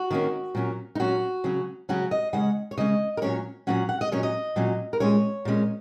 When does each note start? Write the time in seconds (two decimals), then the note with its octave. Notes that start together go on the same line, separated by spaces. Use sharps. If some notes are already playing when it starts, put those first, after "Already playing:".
Already playing: F#4
0.11 D#3 A#3 C#4
0.55 A#2 F#3 C#4
0.95 D#4
0.99 A#2 F#3 C#4 F#4
1.44 C#3 F#3 C#4
1.89 C#3 F#3 C#4 F#4
2.11 D#5
2.33 C#3 G#3 C#4 F#5
2.71 C#5
2.77 C#3 G#3 C#4 D#5
3.17 A#4
3.22 A#2 F#3 C#4 C#5
3.67 A#2 F#3 C#4 F#5
3.89 F#5
4.01 D#5
4.12 A#2 F#3 C#4 C#5
4.23 D#5
4.56 A#2 F#3 C#4
4.93 A#4
5.00 A#2 G#3 C#4 C#5
5.45 A#2 G#3 C#4